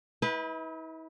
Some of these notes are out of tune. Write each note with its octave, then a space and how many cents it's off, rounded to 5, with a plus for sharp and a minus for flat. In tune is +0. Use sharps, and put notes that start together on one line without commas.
E4 -45 B4 -10